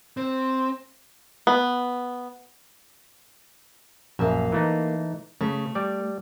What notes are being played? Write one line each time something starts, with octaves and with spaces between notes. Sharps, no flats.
C4
B3
A#1 F#2 A#3 E5
E3 A3 D#4
C#3 A3
G3 D5